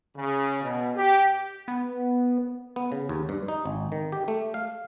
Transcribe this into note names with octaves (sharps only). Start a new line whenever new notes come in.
C#3
B2
G4
B3
B3
C#3
D#2
G2
D#4
G#1
D#3
G4
A3
F5